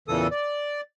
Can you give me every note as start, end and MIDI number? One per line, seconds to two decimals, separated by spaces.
0.08 0.27 40
0.08 0.27 46
0.08 0.27 49
0.08 0.27 52
0.08 0.27 69
0.08 0.27 87
0.31 0.81 74